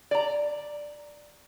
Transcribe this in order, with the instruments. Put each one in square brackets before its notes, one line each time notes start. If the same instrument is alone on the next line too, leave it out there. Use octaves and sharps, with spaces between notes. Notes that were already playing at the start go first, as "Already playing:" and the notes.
[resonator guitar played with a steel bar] D5 A#5